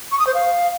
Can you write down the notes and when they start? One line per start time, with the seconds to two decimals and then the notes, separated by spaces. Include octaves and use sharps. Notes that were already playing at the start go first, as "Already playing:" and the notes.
0.12 C#6
0.19 D#6
0.27 C5
0.34 F5